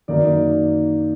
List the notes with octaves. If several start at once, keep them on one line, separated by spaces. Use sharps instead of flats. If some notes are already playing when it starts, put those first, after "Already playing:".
F#2 D#3 F#3 A#3 D#4 D5